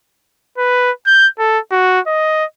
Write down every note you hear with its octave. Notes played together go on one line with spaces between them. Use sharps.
B4
G6
A4
F#4
D#5